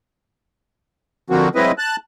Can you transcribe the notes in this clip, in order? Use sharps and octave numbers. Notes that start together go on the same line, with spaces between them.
D3 F3 A#3 C4 F#4
F#3 G#3 C4 E4 B4 D#5
A5 F#6